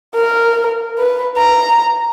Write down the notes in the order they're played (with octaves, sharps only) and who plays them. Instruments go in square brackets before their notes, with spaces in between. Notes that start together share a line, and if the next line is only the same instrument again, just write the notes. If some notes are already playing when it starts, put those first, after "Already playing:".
[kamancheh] A#4
B4
A#5